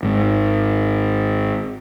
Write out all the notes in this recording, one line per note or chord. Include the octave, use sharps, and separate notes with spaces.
G#1 G#2